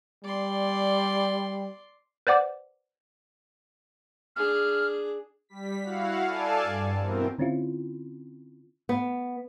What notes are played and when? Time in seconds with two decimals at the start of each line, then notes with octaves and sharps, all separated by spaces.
0.24 G3 D5 C6
2.27 B4 C5 D5 F#5 D6
4.36 D4 G#4 F6
5.49 G3 B6
5.82 E4 F#4 F5 F#5
6.24 A4 D5 F5 G#5 A5
6.63 G2
6.99 B2 E3 C4 A#4
7.38 D3 C4 C#4 E4 F4
8.89 B3